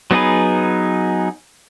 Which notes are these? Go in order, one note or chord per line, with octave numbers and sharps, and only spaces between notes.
F#3 B3 D#4 G#4 B4